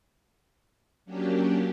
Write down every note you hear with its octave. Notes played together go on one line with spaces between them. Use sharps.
F#3 A#3 C#4 D4 G4